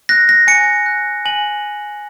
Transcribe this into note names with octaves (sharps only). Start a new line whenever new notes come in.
F#6 A#6
A#6
G#5 C#7
F#6
G#5 F#7